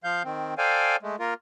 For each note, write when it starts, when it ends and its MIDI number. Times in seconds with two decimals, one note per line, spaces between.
0.04 0.23 53
0.04 0.23 77
0.04 0.23 91
0.24 0.54 51
0.24 0.54 60
0.58 0.96 69
0.58 0.96 72
0.58 0.96 74
0.58 0.96 77
0.58 0.96 79
0.58 0.96 80
1.02 1.16 56
1.02 1.16 57
1.19 1.34 58
1.19 1.34 65
1.19 1.34 70